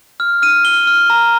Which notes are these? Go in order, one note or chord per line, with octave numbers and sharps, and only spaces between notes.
F6
F6 D#7
F6 G7
F6
A#5